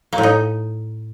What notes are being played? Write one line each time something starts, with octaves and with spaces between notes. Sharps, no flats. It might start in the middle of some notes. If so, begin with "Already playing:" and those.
A#3
A2
D#4